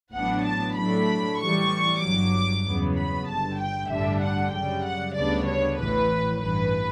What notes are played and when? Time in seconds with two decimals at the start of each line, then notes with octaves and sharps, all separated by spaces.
0.15 A1 A2 F#3 B3 D4 F#5
0.46 A5
0.77 A2 F#3 A3 D4 B5
1.40 A2 E3 G3 C#6
2.02 G1 G2 F#3 D6
2.65 E2 C#3 F#3 B3
2.96 B5
3.28 G1 G2 D3 A5
3.59 G5
3.90 A1 G2 D3 G3 D4 E5
4.21 F#5
4.52 F#2 C#3 G3 G5
4.84 F#5
5.16 D2 C#3 G3 B3 D4 D5
5.47 C#5
5.78 A1 A2 E3 B4
6.41 A1 G2 E3 B4